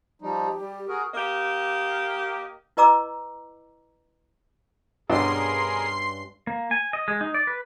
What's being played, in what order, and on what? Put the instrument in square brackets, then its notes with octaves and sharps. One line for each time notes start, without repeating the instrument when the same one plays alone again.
[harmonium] F3 G3 D#4
[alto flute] G4
[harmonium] G3
F#4 G#4 A#4
[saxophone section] A#3 G4 D#5
[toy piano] E4 B4 D#5 A#5 D6 E6
[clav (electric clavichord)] G2 C#4 D4 [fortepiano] B2 [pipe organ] G#4 A#4 [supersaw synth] C6 C7
[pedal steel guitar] A#3
G#5
D#5
G#3
D#4
D5
B4